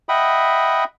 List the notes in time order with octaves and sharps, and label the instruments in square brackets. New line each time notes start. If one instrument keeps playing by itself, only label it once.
[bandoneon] D#5 E5 F#5 G5 B5 D#6